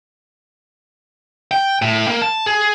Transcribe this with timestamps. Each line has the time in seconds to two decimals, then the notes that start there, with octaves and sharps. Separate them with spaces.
1.51 G5
1.82 A2
2.08 A#3
2.22 A5
2.46 G#4